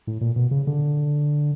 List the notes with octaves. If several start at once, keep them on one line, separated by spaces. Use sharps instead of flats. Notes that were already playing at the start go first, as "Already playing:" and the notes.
A2
A#2
B2
C#3
D3